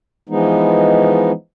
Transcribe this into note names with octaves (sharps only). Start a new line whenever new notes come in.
E3 F3 G#3 B3 D#4